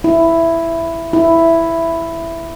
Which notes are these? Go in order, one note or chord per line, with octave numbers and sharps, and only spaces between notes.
E4
E4